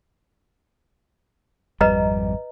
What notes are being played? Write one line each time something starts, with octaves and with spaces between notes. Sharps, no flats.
G#1 F2 G3 B4 D#5 A#5